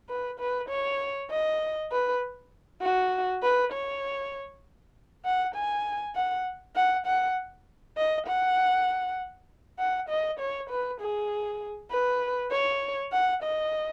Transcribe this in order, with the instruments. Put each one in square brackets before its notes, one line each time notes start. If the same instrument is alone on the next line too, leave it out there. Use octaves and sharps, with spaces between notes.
[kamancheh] B4
B4
C#5
D#5
B4
F#4
B4
C#5
F#5
G#5
F#5
F#5
F#5
D#5
F#5
F#5
D#5
C#5
B4
G#4
B4
C#5
F#5
D#5